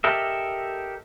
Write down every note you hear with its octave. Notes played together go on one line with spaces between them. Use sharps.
G4 A4 A#4 D#5 E5